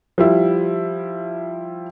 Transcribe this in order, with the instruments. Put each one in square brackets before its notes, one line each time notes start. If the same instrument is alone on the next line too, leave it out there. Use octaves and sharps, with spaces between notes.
[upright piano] F3 G3 E4